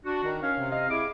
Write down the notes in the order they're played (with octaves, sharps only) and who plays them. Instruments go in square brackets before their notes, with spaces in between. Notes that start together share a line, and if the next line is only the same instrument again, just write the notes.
[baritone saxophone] D4 [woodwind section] F#4
[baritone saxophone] D#3
[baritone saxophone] C#4 [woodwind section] F5
[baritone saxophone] C3
[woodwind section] D#5 F5
[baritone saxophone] E4 [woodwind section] G#4 D6